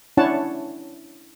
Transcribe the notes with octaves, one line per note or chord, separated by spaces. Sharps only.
C#4 D4 E4 C#5 F#5 A5